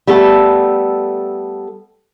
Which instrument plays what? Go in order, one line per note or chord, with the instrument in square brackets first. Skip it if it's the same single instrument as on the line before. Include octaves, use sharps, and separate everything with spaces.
[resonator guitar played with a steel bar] G3 A3 B3 A4